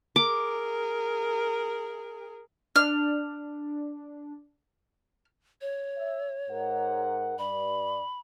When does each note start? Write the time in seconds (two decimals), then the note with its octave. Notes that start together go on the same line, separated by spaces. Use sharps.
0.16 G#4 A#4 D6
2.76 D4 F6
5.61 C#5
5.98 E5
6.50 G#2 A#4 F#5
7.39 G2 D5 B5